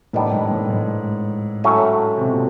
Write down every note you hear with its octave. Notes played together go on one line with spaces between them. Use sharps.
A2 D#3 G3 B3 D4
G#2
A2
G#2
A2 F#3 A3 C#4
C3
B2
A#2